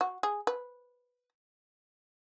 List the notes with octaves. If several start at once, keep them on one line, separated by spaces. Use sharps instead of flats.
F#4
G#4
B4